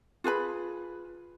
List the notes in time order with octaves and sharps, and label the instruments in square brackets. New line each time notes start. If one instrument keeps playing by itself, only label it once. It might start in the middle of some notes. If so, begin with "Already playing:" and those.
[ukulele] F4 G#4 B4 B5